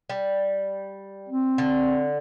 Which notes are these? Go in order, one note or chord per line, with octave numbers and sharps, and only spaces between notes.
G3
C4
D3